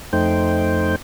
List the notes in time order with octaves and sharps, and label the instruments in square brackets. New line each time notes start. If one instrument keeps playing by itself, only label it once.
[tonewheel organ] F2 A3 D#4 C5 G5